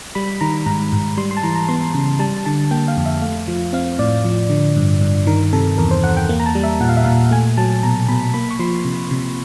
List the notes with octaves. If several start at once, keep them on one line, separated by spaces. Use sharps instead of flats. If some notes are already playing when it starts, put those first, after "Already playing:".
G3 B5
D#3 A#5
G#2 A#5
G#2
G3 C6
C6
A5
E3 A#5
A#5
B3 C6
C6
C#3
G3 A5
D3 A5
A#3 G5
F5
F2
E5
A3 F5
F3
C4 F5
A2 D5
F3
D3
G2
G2
D#3 A#4
C3 A4
E2 A#4
C5
E2 F#5
G5
A#3
A#5
A5
G3
E5
A#2 F#5
F5
E5
A#2 F5
A3 G#5
F#3 A5
B2 A#5
B2 B5
A#3 B5
C#6
F3 C6
C3
C3